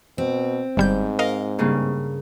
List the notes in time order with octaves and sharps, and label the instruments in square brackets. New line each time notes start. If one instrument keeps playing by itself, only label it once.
[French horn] B2 [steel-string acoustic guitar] C4
[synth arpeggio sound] G1 G3 G6 [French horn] G#2
[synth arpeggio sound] A#4 D#5 F5
[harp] G2 C#3 A#3